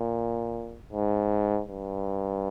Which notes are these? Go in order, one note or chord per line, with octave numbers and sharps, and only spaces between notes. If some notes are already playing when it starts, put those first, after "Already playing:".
Already playing: A#2
G#2
G2